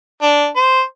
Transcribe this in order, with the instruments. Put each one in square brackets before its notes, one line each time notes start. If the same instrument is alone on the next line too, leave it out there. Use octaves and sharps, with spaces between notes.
[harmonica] D4
C5